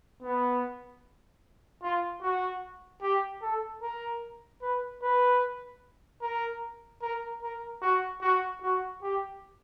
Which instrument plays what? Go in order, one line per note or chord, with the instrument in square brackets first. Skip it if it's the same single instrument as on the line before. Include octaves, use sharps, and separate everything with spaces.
[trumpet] B3
F4
F#4
G4
A4
A#4
B4
B4
A#4
A#4
A#4
F#4
F#4
F#4
G4